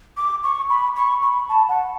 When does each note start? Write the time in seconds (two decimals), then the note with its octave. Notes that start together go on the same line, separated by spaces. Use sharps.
0.17 D6
0.44 C#6
0.70 B5
0.96 C#6
1.22 B5
1.49 A5
1.69 F#5